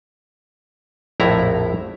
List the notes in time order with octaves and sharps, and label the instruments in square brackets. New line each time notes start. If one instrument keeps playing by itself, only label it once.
[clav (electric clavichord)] A#1 F2 A2 E4 A#5